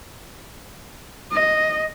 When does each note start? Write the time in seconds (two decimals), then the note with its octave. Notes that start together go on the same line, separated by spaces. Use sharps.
1.32 D#5